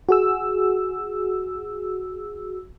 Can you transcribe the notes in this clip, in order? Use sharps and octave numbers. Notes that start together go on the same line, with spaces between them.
F#4 G#4 E6